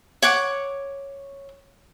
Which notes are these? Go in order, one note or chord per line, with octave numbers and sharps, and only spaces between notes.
C#5 F#5 D6